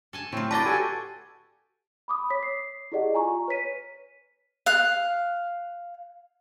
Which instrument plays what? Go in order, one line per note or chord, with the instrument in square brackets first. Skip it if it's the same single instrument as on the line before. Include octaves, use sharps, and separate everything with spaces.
[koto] A4 G#5 A5
[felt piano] A2 [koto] F#3 F4 [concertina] C4
[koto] B4 D#5 G5 [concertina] D5 [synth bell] A5 A6 [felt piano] B5 D6
[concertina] F#4 A4 G#5 [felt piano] G4
[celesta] B5 D6 D#6
C#5 B6
C7
E4 G4 G#4 D5 D#5 F#5
F4 G#5 A#5 C#6
B4 C#5 B6 D#7
[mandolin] F5 F#6